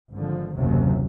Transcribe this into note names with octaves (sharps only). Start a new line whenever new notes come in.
G#1 D3 F3
F#1 D#2 C3 F#3